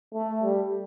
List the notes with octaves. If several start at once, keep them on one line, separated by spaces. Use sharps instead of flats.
A3
G3